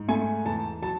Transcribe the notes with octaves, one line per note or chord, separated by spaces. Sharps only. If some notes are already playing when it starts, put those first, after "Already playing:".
Already playing: G#2
A3 G#5
E2 A5
F#3 A5